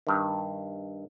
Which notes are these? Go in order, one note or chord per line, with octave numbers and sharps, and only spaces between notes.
G2 D#3